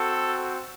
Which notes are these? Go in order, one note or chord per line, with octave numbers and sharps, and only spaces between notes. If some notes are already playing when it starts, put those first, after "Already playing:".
Already playing: C4 F#4 A4